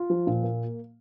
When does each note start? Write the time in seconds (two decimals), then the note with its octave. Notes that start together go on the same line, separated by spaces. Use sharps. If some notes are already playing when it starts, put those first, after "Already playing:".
Already playing: F4
0.10 F3
0.27 A#2
0.43 A#3